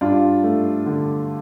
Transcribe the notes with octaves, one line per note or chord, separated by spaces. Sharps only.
G2 D4 F4
A3
D3